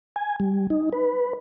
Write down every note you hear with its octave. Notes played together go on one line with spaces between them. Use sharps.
G#5
G3
D#4
B4